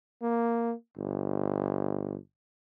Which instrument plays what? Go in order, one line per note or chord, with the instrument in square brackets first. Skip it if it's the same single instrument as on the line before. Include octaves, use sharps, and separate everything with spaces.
[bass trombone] A#3
G1